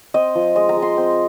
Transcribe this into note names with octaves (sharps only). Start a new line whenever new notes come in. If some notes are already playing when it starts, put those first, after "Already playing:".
C4 D#5
F3
G#3 D#5
A#5
G#3
C6
C4